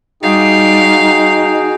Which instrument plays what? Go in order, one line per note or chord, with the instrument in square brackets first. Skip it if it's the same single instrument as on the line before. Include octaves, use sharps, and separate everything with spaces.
[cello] G3 [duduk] D#4 [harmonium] F#4 G#4 G5 [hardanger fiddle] F5